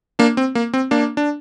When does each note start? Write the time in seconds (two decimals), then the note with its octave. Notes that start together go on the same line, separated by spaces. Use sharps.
0.19 A#3 D4
0.37 C4
0.55 A#3
0.73 C4
0.91 A#3 D4
1.17 D4